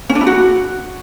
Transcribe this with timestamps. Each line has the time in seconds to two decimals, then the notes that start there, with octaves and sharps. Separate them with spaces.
0.10 C#4
0.15 D4
0.21 E4
0.27 F#4